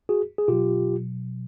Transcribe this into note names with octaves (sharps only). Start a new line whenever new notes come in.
F#4 G#4
G#4
B2 F#3 F4 G4